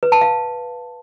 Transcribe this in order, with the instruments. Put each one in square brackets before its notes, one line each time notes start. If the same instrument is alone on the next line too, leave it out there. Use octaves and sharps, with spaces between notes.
[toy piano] B4
A5
F5